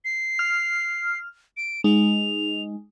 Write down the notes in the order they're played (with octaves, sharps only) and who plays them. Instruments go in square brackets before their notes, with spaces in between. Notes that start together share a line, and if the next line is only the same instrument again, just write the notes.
[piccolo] C7
[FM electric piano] F6
[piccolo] D7
[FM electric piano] G#3 D#4 [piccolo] F7